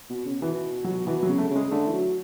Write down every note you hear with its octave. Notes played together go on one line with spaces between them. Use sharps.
B2
C#3
B2 E3
F#3
B2 E3
F#3
C#3
A3
C#3
G#3
D3 A3
E3
F#3